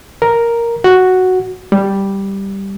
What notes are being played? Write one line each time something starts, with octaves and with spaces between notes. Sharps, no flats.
A#4
F#4
G3